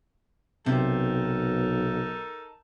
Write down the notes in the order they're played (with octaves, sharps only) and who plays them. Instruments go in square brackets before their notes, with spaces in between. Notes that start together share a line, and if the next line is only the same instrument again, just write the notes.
[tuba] B1 [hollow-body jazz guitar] C3 [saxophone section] D#4 A4 A#4